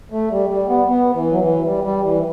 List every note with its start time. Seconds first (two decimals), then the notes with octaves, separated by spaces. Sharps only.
0.12 A3
0.31 G3
0.50 G3
0.69 B3
0.88 B3
1.14 E3
1.31 F#3
1.39 E3
1.65 G3
1.84 G3
2.04 E3